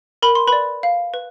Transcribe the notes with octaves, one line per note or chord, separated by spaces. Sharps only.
A#4 B5
C6
B4 D5 B5
F5
B4